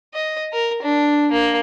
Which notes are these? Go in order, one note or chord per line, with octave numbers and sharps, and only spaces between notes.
D#5
A#4
D4
A#3